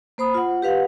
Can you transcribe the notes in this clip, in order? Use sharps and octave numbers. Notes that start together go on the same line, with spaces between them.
A#3 C5 B5 D#6
F4 F#5
G4 B4 F5 F#5